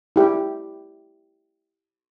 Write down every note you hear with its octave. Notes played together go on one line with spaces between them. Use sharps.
E4 G4